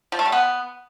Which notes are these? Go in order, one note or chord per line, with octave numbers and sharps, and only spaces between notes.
F3
A3
G3
B3